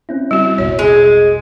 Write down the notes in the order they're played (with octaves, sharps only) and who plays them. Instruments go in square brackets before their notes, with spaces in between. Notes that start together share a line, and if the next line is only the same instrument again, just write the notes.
[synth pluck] C4 C#4 E4
[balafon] G3 F#4
[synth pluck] A1 E2 B2 [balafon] C#5
[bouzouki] G#3